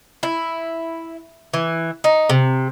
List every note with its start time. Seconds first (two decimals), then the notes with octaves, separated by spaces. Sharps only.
0.23 E4
1.54 E3
2.04 D#4
2.30 C3